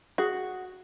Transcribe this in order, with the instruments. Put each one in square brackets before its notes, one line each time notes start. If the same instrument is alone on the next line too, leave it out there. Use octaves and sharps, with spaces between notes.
[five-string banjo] F#4 [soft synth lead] G#4